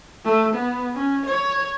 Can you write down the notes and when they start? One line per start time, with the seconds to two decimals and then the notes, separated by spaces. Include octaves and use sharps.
0.25 A3
0.54 B3
0.94 C#4
1.26 C#5